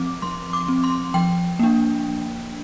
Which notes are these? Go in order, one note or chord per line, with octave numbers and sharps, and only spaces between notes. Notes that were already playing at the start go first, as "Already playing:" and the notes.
Already playing: F3 C4 D6
F3 C6
D6
C4
C6
F3 G5
A#3 D4